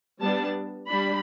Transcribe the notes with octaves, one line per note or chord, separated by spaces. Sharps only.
G3 B3 D4 A5
G3 D4 B5